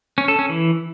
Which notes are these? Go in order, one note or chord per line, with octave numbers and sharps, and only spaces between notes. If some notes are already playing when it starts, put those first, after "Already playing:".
C#4
A4
C#4
E3